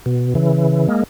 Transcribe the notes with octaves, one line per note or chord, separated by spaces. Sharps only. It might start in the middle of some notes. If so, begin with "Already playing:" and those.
B2
C#3 E3
G#3 A#3